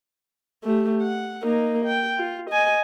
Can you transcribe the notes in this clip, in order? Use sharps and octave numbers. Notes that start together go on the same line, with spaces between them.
A3 G4
F#5
A#3 D#4
G5
F4
D#5 G#5